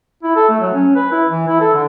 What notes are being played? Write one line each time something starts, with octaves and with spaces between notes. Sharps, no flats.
E4
A4
A3
F#3
C#4
B4
E4
E3
E4
A4
D3